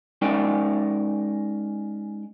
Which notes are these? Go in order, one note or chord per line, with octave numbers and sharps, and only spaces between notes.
G#3 C#4 D#4 A#4 D5 G5